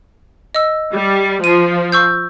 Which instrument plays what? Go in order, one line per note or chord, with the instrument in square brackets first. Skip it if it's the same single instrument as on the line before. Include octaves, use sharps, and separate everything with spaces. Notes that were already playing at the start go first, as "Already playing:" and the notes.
[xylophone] D#5 E6
[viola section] G3
[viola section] F3 [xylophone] D#7
[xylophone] C#6 E6 G6